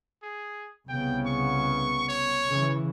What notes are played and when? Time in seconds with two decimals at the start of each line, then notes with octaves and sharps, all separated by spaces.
0.23 G#4
0.88 C2 C#3 B3 G5
1.26 C#6
2.09 C#5
2.46 C#3 E3